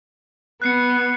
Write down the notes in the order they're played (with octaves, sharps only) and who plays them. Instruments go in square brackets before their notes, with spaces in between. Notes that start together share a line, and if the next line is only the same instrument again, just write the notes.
[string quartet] B3 [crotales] F#6 C7 C#7